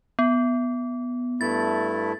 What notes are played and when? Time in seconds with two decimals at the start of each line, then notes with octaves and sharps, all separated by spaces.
0.19 B3
1.41 G2 A3 E4 A6